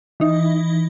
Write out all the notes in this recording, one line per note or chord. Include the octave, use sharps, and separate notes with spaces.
E3 D#4